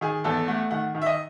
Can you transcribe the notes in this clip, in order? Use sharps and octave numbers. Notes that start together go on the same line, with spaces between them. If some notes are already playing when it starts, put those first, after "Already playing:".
D#3 G#4
E2 A4
A3 F#5
D#3 F#5
D#3
E5
D#5